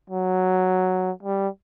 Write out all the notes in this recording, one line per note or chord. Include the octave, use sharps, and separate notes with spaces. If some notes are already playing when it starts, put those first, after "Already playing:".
F#3
G3